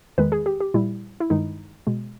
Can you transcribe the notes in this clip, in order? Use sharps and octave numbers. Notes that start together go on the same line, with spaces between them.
E2 D#3 G#3 B4
G#4
G4
G4
A#2 G3 E4
E4
G2 D#3 G#3 D#4
B2 G#3